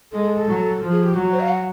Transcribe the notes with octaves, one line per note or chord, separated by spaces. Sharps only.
G#3 A4
A4
A4
F#3
F3
G#4
G4
F#3 F#4
C5
F5
F#5